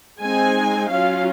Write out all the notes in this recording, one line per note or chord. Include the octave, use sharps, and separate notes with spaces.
G#3 C4 D#4 G#5
F#3 C#4 F4 F5